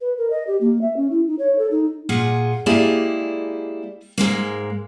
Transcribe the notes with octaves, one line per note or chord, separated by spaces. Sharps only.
B4
A#4
D#5
G4
A#3
E5
C#4
E4
D#4
C#5
A4
D#4
A#2 F4 G#4 F#5
G#3 A#3 E4 G4 G#4 D5
G#2 G#3 A#3